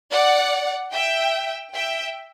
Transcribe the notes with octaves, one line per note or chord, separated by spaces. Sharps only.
D5 F#5
E5 G5
E5 G5